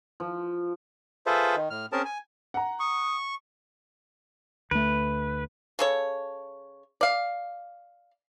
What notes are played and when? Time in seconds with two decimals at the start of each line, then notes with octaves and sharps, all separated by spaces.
0.20 F3
1.26 F4 G#4 A4 B4 C5 E5
1.56 D#3
1.70 A2 F6
1.92 C4 C#4 G#4 A#4 A5
2.05 G#5
2.54 F#5 A#5
2.80 C#6 D#6
4.71 D2 A3 B4
5.79 C#3 A4 C#5
7.01 D5 F5